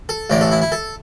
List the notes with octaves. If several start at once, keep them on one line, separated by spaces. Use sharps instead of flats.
A4
A1 A2 E3 D5
A4
E4
E4
A4